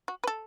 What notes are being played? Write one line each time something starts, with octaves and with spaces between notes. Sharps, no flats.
F#4
B4
A4